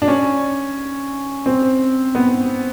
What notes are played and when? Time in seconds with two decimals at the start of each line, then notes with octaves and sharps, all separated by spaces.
0.02 D4
0.08 C#4
1.46 C4
2.15 B3